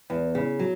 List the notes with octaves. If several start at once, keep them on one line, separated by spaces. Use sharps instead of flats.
E2
C#3
F#3